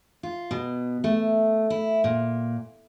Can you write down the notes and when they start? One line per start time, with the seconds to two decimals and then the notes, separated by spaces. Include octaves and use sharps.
0.23 F4
0.51 B2
1.04 A3
1.70 E4
2.04 A#2